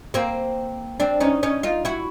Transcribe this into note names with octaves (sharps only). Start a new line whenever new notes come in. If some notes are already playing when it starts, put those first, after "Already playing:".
A#3 C4
C4 D4
C#4 D#4
C#4 D#4
D#4 F4
E4 F#4